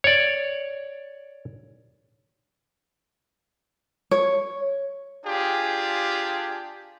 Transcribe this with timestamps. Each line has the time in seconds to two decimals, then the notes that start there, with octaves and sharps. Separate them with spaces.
0.04 C#5 D5
4.11 C#5
5.26 D4 F4 G4 G#4